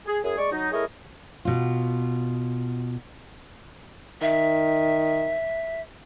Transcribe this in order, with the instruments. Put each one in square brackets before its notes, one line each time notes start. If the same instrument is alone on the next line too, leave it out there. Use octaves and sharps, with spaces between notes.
[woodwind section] G#4
F#2 G#4
G#3 D5 C#6
F#3 D#4
A3 E4 G#4 A#4 C#5 D#5
[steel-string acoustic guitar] B2 F4
[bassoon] D#3 [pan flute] E5